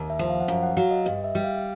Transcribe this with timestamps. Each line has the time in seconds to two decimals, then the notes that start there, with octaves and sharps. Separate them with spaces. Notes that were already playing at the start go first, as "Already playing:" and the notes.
Already playing: D#2
0.10 E5
0.19 F3
0.29 F5
0.40 F#5
0.48 F#2 F5
0.63 F#5
0.77 F#3 F5
0.91 D#5
1.06 G2 D#5
1.24 E5
1.35 G3
1.44 F5